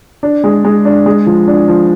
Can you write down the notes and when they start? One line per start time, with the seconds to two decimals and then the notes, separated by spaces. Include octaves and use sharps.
0.23 D4
0.44 G#3
0.65 G#3
0.85 D4
1.06 G#3
1.26 F3
1.48 D4
1.68 F3